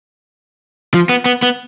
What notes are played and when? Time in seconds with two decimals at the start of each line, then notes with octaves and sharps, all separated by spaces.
0.94 F3
1.09 B3
1.26 B3
1.43 B3